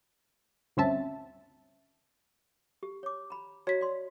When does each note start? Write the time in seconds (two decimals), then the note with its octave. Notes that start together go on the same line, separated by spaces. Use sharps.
0.77 D2 G2 C4 C#4 E5 A5
2.83 G4
3.03 C#5 D6
3.30 A#5 B5
3.67 F#4 C#5 D#5 A#5 B6
3.81 D5 C6